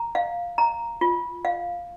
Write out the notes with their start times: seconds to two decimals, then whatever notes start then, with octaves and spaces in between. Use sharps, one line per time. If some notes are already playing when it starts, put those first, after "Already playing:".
Already playing: A#5
0.15 F5
0.58 A#5
1.01 F4
1.45 F5